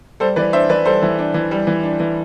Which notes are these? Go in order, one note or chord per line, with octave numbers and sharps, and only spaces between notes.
G3 A4 C5
E3 B4 D5
D4 C5 E5
E3 B4 D5
G3 A4 C5
E3
D4
E3
G3
E3
D4
E3